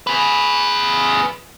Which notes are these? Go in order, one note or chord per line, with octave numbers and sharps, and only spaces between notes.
G#4 B4